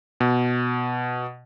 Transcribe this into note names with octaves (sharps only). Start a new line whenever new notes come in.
B2